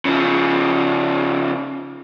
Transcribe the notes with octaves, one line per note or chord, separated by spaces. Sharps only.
C#3 F3